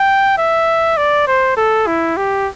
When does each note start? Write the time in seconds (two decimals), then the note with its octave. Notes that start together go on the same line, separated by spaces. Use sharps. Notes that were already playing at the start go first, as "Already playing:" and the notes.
Already playing: G5
0.38 E5
0.97 D5
1.28 C5
1.57 A4
1.87 E4
2.17 G4